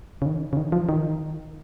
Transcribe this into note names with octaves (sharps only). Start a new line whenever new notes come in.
C#3
D#3
C#3
D#3
F3
D#3